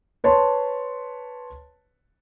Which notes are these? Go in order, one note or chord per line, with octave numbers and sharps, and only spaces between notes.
B4 C#5 A5 C6